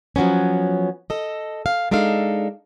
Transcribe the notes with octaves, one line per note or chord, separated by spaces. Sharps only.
F3 F#3 B3 C#4
A4 D#5
F5
G#3 D4 D#4 A4 F5